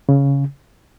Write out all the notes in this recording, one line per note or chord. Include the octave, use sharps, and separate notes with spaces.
C#3